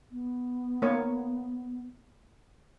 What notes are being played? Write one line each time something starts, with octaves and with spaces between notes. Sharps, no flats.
B3
A#3 C#5